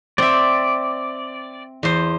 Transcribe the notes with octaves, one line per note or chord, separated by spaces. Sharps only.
C4 D5 E5
E2 C5